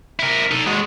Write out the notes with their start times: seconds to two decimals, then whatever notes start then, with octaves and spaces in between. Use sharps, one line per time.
0.20 E4 A#4
0.51 D#4 A4
0.67 G#3 F#4